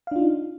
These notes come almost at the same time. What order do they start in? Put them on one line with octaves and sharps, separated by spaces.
F5 D4 F4 D#4